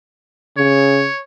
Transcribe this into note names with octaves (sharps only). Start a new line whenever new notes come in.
C#3 C#5